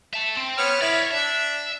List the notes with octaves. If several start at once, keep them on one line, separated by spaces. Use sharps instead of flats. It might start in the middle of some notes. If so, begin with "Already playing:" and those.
E5 A5
C4
B3 C#5 F6
E4 C#5 D5
D4 E5